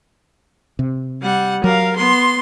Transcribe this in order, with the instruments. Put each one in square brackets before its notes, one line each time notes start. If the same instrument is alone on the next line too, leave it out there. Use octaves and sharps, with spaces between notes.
[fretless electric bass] C3
[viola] G3 F#5
[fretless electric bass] F#3 [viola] A#4 F5
[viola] B3 C6